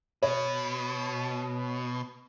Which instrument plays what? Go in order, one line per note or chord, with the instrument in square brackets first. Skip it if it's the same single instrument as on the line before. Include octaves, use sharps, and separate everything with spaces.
[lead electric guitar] B2 [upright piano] C#5